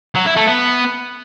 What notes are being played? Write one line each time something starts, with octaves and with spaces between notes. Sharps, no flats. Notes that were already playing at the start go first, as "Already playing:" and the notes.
F#3
E4
A3
B3